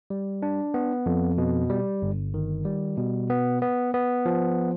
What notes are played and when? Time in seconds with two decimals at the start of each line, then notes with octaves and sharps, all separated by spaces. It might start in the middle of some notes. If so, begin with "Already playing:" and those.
0.10 G3
0.42 D4
0.74 B3
1.06 F2
1.38 B2
1.70 G3
2.02 G1
2.34 D#3
2.65 G3
2.97 B2
3.30 B3
3.62 B3
3.94 B3
4.26 F3